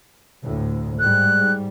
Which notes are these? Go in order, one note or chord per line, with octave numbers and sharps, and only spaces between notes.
D2 A2
G#2 G3 F#6